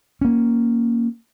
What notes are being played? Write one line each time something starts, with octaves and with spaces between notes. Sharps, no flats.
A#3 C#4